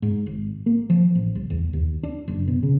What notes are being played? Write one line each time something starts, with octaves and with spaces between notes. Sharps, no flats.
G#2
G#1
A#3
F3
A1
C2
E2
D#2
D4
F#1
B2
C#3